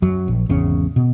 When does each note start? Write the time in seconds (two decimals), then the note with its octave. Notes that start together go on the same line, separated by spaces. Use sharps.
0.02 F#2 F#3
0.28 A#1
0.49 G#1 E2 C#3 C#4
0.96 B2